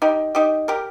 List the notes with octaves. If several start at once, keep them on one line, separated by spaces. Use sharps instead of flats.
D#4 G4
D#4 G4
G4 A#4